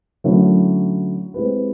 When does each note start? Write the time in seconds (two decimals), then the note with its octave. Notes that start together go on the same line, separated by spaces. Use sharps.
0.24 D3 F#3 A3 C#4 E4
1.34 G#3 C4 E4 G4 B4